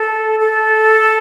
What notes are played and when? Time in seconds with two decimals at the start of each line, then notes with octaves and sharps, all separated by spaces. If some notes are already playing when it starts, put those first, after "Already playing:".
Already playing: A4
0.40 A4